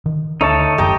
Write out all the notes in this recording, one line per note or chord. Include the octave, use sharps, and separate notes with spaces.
D#3
D2 A3 D4 D#4 C#5 A5
F1 F#2 D#3 G4 D#5 G5 A#5